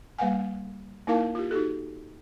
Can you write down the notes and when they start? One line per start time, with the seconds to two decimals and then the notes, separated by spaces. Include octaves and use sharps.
0.18 G3 A#3 B4 F5 F#5 G#5
1.07 A#3 D#4 E4 A#4 F5 A5
1.35 F4 G4
1.51 D#4 F#4 G4 A4